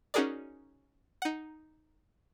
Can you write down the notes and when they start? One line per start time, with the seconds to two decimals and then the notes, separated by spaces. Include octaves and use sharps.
0.14 C#4 D#4 F#4 G#4 A#4 D5
1.22 D#4 F#5